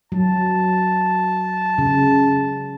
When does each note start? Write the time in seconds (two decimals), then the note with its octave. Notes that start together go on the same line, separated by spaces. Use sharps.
0.12 F#3 A5
1.78 C#3